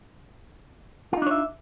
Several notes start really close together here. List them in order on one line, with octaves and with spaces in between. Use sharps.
F4 D#4 D4 C#5 E5